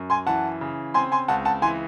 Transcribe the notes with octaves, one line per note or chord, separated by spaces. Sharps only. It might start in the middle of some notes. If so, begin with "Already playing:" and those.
Already playing: F#2
G#5 C6
E3 F#5 A5
C#3
C4 G#5 C6
G#5 C6
C#2 F#5 A5
F#5 A5
E3 G#5 C6